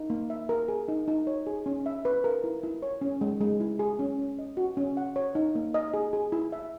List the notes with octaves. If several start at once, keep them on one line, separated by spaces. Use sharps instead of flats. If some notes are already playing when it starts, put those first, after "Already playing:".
Already playing: D#4
A#3
E5
A#4
G#4
D#4
D#4
C#5
G#4
C#4
E5
B4
A#4
E4
E4
C#5
C#4
G#3
G#3
E4
G#4
C#4
C#4
D#5
F#4
C#4
F#5
C#5
D#4
A#3
D#5
G#4
G#4
E4
E5